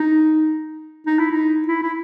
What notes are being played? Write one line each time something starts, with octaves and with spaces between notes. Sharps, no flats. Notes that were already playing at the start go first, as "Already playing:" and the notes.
Already playing: D#4
D#4
E4
D#4
E4
E4